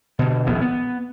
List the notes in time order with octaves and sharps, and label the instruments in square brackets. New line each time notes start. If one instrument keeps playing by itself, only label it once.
[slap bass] B2 D3
D#1 A#1 B3
B3